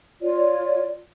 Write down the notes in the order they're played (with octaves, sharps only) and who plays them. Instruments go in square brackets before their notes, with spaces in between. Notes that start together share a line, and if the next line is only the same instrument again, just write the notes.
[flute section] F4 C#5 D5